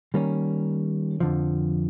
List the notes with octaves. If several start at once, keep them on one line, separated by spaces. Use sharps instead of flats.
D#3 G3 A#3 C#4
F2 D3 F3